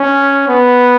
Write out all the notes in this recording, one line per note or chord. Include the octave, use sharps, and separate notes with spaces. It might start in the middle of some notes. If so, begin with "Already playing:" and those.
Already playing: C#4
B3